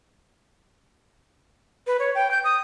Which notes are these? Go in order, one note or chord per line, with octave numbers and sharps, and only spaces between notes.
B4
C#5
G5
G6
D#6